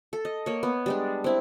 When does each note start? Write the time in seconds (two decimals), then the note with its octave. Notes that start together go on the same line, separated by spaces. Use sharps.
0.13 A4
0.25 D#5
0.46 A#3 C#5
0.63 B3
0.86 G3 G#3 D4
1.24 C4 E4